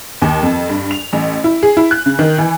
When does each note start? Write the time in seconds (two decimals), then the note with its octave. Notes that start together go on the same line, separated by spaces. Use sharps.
0.22 D#2
0.43 F2
0.69 G2
0.91 F7
1.13 A1
1.44 E4
1.63 G#4
1.77 E4
1.91 F#6
2.06 C#3
2.19 D#3
2.38 E3